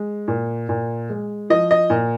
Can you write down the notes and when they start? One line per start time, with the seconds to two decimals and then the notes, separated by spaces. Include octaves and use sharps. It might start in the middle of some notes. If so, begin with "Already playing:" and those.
Already playing: G#3
0.28 A#2
0.69 A#2
1.10 G#3
1.50 F3 D#5
1.71 D#5
1.90 A#2